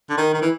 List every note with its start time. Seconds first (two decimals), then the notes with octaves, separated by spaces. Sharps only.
0.10 D3
0.17 D#3
0.34 D#3
0.42 E3